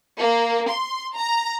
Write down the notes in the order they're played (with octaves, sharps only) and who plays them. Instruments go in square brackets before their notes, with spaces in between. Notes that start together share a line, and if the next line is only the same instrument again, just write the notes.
[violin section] A#3
C6
A#5